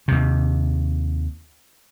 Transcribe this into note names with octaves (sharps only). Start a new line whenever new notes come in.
D#2 C3